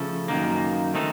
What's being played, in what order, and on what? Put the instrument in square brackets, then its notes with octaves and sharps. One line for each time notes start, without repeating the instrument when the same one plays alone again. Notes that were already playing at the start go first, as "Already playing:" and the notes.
Already playing: [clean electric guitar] C#3 F3 A3 C#4 A4
F#2 D#3 A#3
D#3 A3 C4 D#4 A4